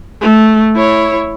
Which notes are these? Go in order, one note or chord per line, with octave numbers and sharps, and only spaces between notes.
A3
E4 C#5